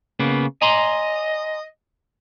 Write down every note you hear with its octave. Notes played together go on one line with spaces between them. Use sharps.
C#3 A#3 B3
D#5 G#5 A#5 C6